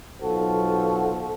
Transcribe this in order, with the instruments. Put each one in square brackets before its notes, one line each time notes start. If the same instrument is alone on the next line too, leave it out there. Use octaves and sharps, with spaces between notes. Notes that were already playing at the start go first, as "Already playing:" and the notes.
[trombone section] B1 F4 F#4 A4 C5